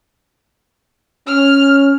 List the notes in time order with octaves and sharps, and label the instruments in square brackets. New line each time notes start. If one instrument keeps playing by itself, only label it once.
[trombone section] C#4 [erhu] F6